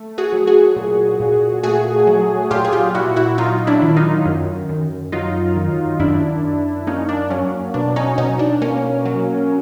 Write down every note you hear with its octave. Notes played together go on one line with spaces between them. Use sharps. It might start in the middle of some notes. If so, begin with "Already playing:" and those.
Already playing: A3
F#4 G#4
F#3
F#4 G#4
A#2
A#2
A3 F#4 G#4
F#3
A#2 F4 G4
G#4
F4 G4
A#2 E4 F#4
E4 F#4
F#3 D#4 F4
D4 E4
D#3
D#4 F4
F#2
F#2
F#3 D#4 F4
D#3
F#2 D4 E4
F#2
A#3 C#4 D#4
D4
F#3 C#4
B2 D4
C#4 D#4
B2 C#4 D#4
D4
A#3 C#4
F#3